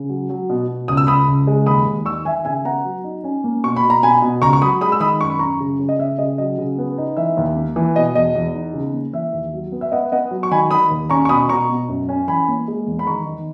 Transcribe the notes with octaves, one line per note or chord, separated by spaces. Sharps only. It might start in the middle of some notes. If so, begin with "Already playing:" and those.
Already playing: C#3
F#3
F#3
B2
B2
C#2 D#6
E6
C#2 B5 D#6
C#2
G#3
D#2 B5 D#6
D#2
D#3 C#6 E6
D#3 E5 G#5
C#3 E5 G#5
B3 F#5 A#5
F#3
D#4
C#4
A#3
B2 C#6
B5
B2
A#5
B2 G#5 B5
B2
C#2 A#5 C#6
C#6
F#3 B5 D#6
G#3 B5 D#6
E6
D#3 B5 D#6
F#2 C#6
B5
F#2 A#5 C#6
C#3
C#3
D#5
C#3 E5
C#3 D#5
F#3 D#5
C#3
B3
D#4
E3 E5
D#2
A#3
E3
B2 D#5
E2 D#5
E2
D#4
C#3
A#3
E3 E5
D#2
F#3
B3
E5
B3 D#5 F#5
B3 D#5 F#5
F#3
C#6
D#3 G#5 B5
D#3 B5 D#6
D#2
C#4 A#5 C#6
C#6
B2 B5 D#6
B2 A#5 C#6
B2
F#2
C#4
E3 G#5 B5
A#3
G#3
E2
B5
D#3 A#5 C#6
D#3